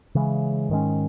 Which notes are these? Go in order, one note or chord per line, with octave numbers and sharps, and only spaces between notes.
C#3 E3 G#3
G#2 D#3 G#3 C#4